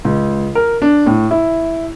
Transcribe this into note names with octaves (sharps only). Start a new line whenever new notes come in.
C#2
A#4
D4
A2
E4